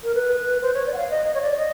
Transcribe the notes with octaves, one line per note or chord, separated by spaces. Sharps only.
A#4
B4
C5
C#5
D5
F#5
F5
D#5
D#5
C#5
D5
D#5